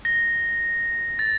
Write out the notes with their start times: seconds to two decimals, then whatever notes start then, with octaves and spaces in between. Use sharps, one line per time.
0.05 A#6
1.19 A6